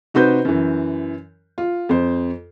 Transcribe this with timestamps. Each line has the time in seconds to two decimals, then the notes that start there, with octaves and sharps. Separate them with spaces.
0.14 C3 D#4 F#4 B4 C5 G6
0.45 F#2 E3
1.58 F4
1.89 F2 C5